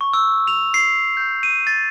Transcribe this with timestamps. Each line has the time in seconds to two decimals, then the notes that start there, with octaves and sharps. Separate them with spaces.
0.01 C#6
0.13 E6
0.47 F7
0.74 C7
1.17 G6
1.43 D#7
1.67 A6